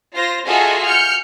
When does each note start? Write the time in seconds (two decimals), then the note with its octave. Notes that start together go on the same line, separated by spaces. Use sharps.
0.15 F4 C5 A#6
0.47 F4 F#4 G#4 A4 D#5 E5
0.85 F6 G6 C#7